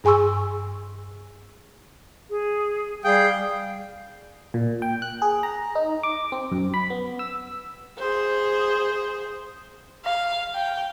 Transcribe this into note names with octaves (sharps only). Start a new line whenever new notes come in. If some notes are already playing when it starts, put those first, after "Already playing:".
G2 G#4 G#5 C6 C#6 E6
G#4
G3 G#4 F5 G5
A#2
G5
F#6
G#4
A#5
D#4
D6
C4
F#2
B5
B3
E6
G#4 C5
F5
G5